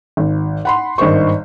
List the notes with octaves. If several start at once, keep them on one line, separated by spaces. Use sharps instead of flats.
G#1
F#5 B5 C6
G#1 G2 D#3 C5 C#6